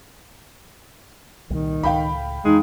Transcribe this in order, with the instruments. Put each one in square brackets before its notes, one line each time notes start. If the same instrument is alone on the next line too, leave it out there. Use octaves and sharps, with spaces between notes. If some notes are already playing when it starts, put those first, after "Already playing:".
[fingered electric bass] C2 A#2 G3 [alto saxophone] D#3
[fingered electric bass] C#2 A2 [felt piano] F5 G5 B5
[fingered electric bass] F2 E3 [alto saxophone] G#3 [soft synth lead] D#4